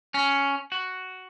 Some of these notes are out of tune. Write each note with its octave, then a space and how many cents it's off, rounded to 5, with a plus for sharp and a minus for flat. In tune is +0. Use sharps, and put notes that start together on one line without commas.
C#4 +5
F#4 +5